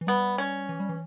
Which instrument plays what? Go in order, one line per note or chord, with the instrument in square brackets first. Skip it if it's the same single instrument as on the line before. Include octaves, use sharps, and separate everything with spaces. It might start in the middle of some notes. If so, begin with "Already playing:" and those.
[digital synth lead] E3
[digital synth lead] G3 [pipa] B3
[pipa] C#4
[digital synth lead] E3
G3
E3